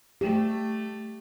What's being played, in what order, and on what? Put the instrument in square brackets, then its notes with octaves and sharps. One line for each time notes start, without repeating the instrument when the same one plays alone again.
[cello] A3 [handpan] G4